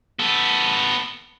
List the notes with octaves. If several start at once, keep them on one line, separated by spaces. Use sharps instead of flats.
B3 A4